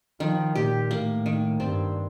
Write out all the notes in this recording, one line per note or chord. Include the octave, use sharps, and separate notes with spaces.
D#3 F3
A#2 G4
A2 A#3
D#3
G2 C4